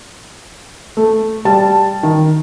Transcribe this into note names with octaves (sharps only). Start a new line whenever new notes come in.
A3
G3 A5
D#3